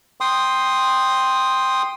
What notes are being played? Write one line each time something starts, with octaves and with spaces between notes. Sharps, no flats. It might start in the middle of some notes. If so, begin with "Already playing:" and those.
G5 C6 D#6